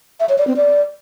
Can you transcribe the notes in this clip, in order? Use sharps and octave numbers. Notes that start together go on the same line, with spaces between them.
E5
C#5
D5
C4
D5